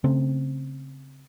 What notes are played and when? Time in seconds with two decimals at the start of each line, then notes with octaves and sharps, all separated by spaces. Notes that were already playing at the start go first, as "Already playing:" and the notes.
0.04 C#3 A3 C4